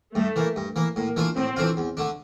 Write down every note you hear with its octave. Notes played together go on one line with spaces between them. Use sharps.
G2 A3
E3 A#3
G2
E3 A#3
A2 A#3
E3 A3 D4 F4
A2 C4
E3 A3 D4 F4
E2
D3 A3 D4